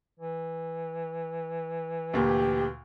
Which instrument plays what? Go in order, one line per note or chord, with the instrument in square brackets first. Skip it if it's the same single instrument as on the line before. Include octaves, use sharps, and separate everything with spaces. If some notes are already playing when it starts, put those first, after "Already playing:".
[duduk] E3
[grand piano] D2 A#2 [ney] G4